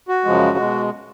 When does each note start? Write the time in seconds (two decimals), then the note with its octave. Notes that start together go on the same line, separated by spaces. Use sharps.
0.08 F#4
0.25 F#2 C#3 F3 G#3
0.58 B2 G#3